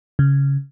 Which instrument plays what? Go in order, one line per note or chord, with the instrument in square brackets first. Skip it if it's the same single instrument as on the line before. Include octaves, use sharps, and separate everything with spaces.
[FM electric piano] C#3